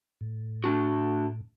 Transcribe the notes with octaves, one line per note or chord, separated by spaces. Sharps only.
A2
A3 D4 F#4